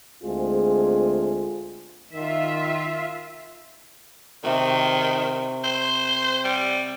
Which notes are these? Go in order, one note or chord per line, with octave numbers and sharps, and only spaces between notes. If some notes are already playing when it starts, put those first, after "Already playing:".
D2 G#3 A3 C4 F4 G#4
D#3 F4 E5
C3 D#3 C#6
C5
G3